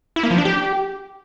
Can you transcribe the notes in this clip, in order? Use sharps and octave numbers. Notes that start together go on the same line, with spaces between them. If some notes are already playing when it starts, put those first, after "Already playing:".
E4
A#3
F3
D4
G4